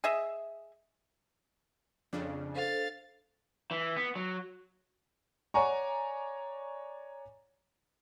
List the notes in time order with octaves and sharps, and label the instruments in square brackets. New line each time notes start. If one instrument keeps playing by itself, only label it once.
[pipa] G#4 D#5 E5
[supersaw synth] F2 C#3 [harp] D4
[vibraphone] A4 C5 [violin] F5 A6
[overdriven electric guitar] E3
B3
F#3
[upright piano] C#5 D5 F#5 G#5 A#5 C#6